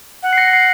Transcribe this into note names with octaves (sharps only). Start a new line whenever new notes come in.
F#5
C7
A#6 C#7
A#6
C7